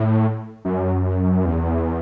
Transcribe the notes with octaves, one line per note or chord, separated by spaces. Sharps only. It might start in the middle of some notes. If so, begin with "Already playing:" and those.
Already playing: A2
F#2
E2